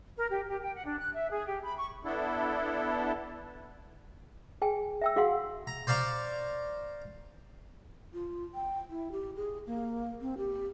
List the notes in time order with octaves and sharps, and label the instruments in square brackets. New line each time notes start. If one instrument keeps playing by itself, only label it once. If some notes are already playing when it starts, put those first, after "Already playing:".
[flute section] A#4
G4
G4
G5
F#5
D4
F#6
E5
G#4
G4
B5
C#6
[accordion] B3 D4 E4 A4
[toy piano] G#4 G5 G#5
E5 G5 E6
F#4 G#4 F5 F#5 C6
[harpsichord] A#5
C5 D5 F5 A#5 C#6
[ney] F4
G5
E4
G4
G#4
A#3
C4
G4